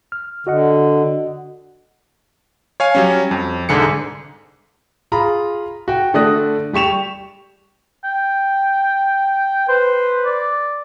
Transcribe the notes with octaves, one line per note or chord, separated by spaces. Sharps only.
F6
D3 F#4 D#5 F#5
C#5 F5 G#5
F#3 G3 C#4
F2
C2 G#2 D3 G#4 C#7
F4 G#4 A#5 B5
F#4 G5
D3 A3 D5 D#6 F#6 A#6
G3 G4 C#6 E7 F7
G5
B4 C5
D5